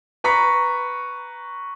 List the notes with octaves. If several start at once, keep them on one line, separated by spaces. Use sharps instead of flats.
B4 A#5 C#6 B6